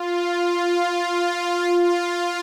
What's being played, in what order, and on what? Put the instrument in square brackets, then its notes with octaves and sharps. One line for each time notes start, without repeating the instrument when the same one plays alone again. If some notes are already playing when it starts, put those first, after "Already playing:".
Already playing: [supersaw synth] F4
F4
F4